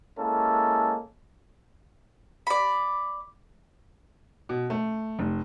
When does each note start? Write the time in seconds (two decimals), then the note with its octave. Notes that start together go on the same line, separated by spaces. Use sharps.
0.18 G#3 A#3 C#4 E4 A4
2.47 D5 B5
4.49 B2
4.70 A3
5.19 F1